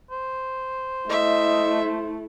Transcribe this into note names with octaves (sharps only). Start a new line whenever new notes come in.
C5
A3 E4 D#5 E5